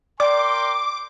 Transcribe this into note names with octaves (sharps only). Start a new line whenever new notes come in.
A#4 D5 G5 C6 D6